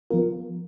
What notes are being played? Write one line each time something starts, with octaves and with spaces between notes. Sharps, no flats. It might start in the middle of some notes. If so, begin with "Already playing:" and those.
F3 B3 F4 A#4